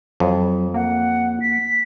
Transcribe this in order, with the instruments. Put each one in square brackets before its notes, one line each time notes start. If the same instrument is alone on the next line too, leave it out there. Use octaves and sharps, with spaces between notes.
[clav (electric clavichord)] F2 [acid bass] F#3
[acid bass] A#3 [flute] F#5
[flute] B6